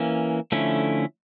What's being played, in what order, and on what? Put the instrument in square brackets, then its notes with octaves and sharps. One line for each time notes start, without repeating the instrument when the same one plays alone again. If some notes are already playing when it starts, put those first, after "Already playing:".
Already playing: [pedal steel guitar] E3 A#3 C#4
D3 F3 A3 C#4 E4